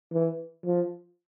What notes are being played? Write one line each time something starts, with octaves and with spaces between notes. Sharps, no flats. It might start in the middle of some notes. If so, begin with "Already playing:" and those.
E3
F3